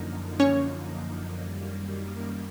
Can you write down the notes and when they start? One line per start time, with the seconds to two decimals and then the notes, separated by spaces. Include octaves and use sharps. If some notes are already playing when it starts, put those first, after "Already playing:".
Already playing: F#2 D3 F3 A#3 D#4
0.40 C#4 C#5
1.40 F#2 D#3 G3 A#3